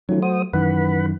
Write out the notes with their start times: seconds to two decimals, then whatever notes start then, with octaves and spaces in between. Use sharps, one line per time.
0.09 D#3 F3 F#3 A3 C#4
0.22 F#4 C5 D#6
0.53 F#2 D#3 E3 B4 F#5 B5